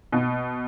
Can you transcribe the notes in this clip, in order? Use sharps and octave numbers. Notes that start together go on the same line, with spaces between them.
B2